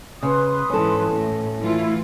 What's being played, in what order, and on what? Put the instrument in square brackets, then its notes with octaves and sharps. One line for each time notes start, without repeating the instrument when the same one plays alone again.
[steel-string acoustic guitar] C#3 [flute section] B4 C6 D#6
[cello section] G#2 E3 [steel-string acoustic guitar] C#4 A4
[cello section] A2
[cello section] E3 A3 F4 [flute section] E4